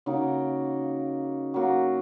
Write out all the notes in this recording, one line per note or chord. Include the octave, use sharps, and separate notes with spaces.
C#3 A#3 D#4 F#4
F#3 A#3 F#4